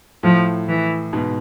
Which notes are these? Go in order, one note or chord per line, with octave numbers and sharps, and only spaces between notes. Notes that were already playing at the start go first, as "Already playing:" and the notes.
A2 F3
E3
G#2 B2